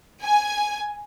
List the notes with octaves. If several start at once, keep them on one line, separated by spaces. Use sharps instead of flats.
G#5